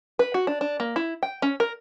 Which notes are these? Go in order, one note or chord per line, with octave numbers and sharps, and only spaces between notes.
B4
F#4
D4
D4
A#3
E4
G5
C#4
A#4